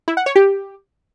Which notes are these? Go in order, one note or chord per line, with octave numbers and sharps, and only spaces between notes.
E4
F#5
C#5
G4